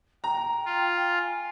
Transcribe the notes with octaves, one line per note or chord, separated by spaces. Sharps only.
G5 A#5
F4
G#5